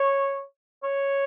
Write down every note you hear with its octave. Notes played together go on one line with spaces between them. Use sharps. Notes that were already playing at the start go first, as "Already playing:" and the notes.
Already playing: C#5
C#5